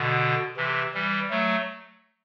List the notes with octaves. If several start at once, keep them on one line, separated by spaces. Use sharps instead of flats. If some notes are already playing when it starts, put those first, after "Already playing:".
Already playing: B2 D3
C3 E3
E3 G3
F#3 A3